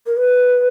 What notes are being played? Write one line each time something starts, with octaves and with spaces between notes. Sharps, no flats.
A#4
B4